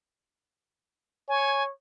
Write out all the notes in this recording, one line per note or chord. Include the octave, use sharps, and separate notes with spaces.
C#5 G#5